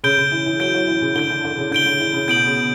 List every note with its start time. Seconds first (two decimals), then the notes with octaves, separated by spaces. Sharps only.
0.04 C#3 G6 D7 G7
0.18 C#3
0.32 E3
0.46 E3
0.60 F#3 G6 D7 G7
0.74 F#3
0.87 E3
1.02 C#3
1.15 D3 G6 D7 G7
1.30 E3
1.45 D3
1.58 C#3
1.71 D3 G6 D7 G7
1.86 D3
2.00 E3
2.14 C#3
2.28 B2 G6 D7 F#7
2.47 C#3